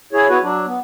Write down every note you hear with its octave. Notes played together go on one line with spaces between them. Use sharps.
E4 G#4 C#5
B3 E4 F#4 B4 C#5
F#3 D4
B3